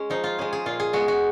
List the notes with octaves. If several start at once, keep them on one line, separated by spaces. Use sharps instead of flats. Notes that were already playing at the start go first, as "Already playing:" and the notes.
Already playing: G#3 C#4
F3 D#4
F4
G#3 C#4 G#4
G#4
A#2 F4
G#4
G#3 B3 F#4
F#4